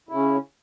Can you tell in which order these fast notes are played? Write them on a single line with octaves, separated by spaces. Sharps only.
E4 C#3 C#4